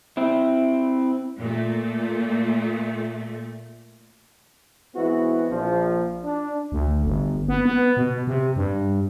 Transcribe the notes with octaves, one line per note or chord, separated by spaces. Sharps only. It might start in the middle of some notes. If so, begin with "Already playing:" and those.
C4 E4
A#2 A3
E3 G#3 B3 C4 E4 F#4
A#1 F3
D4
D2
G1
B3
B3
B2
C3
G2